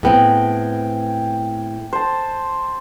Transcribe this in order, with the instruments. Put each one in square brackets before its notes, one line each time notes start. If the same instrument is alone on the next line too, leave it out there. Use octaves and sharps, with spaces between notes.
[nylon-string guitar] A2 B3 C4 [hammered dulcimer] G#4 G5
[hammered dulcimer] C5 A5